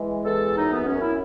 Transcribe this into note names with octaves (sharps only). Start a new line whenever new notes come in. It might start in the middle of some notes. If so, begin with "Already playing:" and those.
Already playing: E3 G#3
E2 A4
F#2 D#4
B3
F#2 C#4
E4